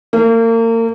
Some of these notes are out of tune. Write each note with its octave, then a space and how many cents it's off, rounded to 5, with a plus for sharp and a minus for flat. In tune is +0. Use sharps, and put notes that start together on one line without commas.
A#3 -35